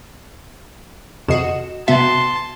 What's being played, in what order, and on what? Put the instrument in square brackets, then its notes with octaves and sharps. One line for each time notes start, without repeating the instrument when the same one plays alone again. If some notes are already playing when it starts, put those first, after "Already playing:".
[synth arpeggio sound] F2 C3 C7 [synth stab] F#4 D#5 E7
[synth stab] C3 B3 F#4 [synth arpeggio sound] E5 [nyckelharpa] A5 C6